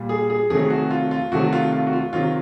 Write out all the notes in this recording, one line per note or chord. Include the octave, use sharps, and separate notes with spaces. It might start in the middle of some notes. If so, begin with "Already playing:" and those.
Already playing: A#2 G3
G#4
G#4
F2 C3 D#3 F#3 A3 G#4
F#4
F4
F4
F2 C3 D#3 F#3 A3 F#4
F4
F4
F#4
F4
C3 D#3 F#3 F4